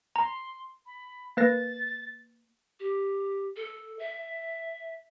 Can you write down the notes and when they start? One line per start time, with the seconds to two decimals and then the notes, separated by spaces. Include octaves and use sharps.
0.16 A#5 C6
0.86 B5
1.37 A#3 B4 A6 A#6
2.80 G4
3.56 A4
3.99 E5